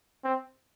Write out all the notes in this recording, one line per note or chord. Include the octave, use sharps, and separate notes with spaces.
C4